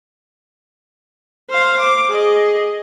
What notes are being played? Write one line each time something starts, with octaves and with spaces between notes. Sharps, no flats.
C5 F5
D6
G#4 D#5